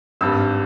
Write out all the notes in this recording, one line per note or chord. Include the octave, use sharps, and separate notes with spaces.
G#1 G2 G3 E6